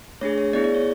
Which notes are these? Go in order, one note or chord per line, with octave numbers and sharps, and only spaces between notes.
A3 D4 G#4 C#5
C#5
B3 E4 G#4 D5
D5
C#5